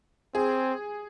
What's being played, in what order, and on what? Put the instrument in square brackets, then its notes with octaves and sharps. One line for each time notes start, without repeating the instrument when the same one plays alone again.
[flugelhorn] C4 [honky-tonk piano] G#4